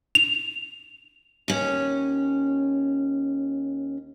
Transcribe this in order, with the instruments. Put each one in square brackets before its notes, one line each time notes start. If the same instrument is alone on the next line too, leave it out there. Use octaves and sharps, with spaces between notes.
[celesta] F7
[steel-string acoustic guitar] D#2 C#4